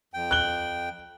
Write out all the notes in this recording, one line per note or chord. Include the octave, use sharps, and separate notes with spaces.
F2 G5
F#6 G7